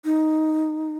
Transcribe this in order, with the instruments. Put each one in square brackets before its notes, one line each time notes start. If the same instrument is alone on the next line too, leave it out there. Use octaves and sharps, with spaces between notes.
[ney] D#4